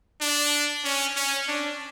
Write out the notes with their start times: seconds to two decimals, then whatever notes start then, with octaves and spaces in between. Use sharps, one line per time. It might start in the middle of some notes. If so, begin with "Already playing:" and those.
0.21 D4
0.84 C#4
1.16 C#4
1.48 D4